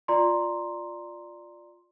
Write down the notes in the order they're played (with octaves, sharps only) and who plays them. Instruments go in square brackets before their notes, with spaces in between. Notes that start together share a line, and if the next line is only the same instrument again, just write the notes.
[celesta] F4 D5 A#5 C6